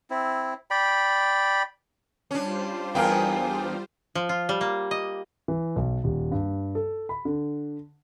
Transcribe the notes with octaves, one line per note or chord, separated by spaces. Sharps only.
C4 E4
D5 G5 B5
G3 C#4 D4 F4 C5
E2 B3 D4 A#4 F5 G5 G#5
F3
F4
G3
A#3
D#5
E3
B1
D#1
G2
A4
B5
D3